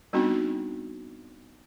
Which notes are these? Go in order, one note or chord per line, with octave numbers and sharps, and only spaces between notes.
G3 B3 C4 D4 D#4 F#4